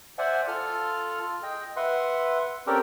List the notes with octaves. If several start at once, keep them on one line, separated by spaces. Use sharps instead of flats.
C5 D5 E5 F#5 G#5
F4 A4 F6
G#4 D#5 G5
B4 E5 F#5 C6
C4 C#4 G4 A4 A#4 D5